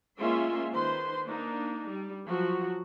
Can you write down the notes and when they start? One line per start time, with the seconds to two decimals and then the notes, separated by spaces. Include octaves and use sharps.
0.20 G#3 A#3 C#4 F4 E5 C6
0.75 D#3 B4 C5 C6
1.28 A#3 D4 D#4
1.88 G3
2.28 F3 F#3 F#4